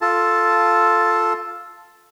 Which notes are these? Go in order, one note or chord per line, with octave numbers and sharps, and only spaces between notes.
F4 A4 A5